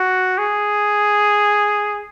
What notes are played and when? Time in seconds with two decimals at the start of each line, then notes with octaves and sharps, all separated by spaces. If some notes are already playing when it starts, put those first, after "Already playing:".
Already playing: F#4
0.38 G#4